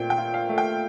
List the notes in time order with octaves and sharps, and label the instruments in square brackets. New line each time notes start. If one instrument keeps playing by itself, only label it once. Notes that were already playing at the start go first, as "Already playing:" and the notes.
Already playing: [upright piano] A#2 A3 C4 G5
G5
F4
F5
A3
G5